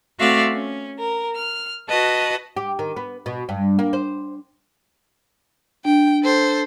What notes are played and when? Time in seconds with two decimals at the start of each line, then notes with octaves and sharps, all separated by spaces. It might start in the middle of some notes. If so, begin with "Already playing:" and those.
0.20 A3 C4 F#4 D5 E5 F5
0.53 C#4
0.99 A#4
1.35 F6
1.88 F#4 B4 D#5 A5
2.57 G4
2.79 D#3
2.96 B3
3.26 B2
3.49 G2
3.79 A#3
3.93 C5
5.85 D4 G5
6.23 A4 C5